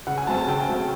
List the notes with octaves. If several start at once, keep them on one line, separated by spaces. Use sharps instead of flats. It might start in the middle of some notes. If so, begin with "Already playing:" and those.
C#3 F#5
G#5
F#3 A3 C4 A5
A5
C#3 G5
F#3 A3 C4